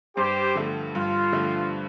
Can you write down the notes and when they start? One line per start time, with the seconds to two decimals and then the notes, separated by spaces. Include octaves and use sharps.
0.17 G2 G4 C5
0.55 D3 F3 A3
0.94 G2 F4
1.32 D3 F3 A3